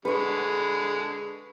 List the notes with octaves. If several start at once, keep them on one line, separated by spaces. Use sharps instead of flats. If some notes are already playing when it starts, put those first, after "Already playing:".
D3 G#3 B4 C#6